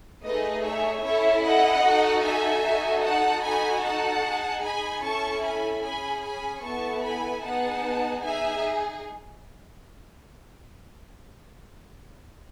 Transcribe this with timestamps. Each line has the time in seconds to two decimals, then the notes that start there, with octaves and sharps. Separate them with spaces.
0.24 A3 D#4 G#4 B4 D#5
0.64 C#5 E5
1.04 C#4 E4 A4 C#5 E5
1.44 D#5 F#5
1.83 D#4 F#4 A4
2.23 E5 G#5
2.64 D#4 F#4 A4
3.03 F#5 A5
3.43 D#4 F#4 A4 G#5 B5
3.83 F#5 A5
4.23 D#4 G#4
4.63 G#5 B5
5.03 C#4 E4 A4 A5 C#6
5.43 G#5 B5
5.83 C#4 G#4 G#5 B5
6.23 G#5 B5
6.63 B3 E4 A4 A5 C#6
7.03 G#5 B5
7.43 B3 D#4 G#4 F#5 A5
8.23 D#4 G#4 E5 G#5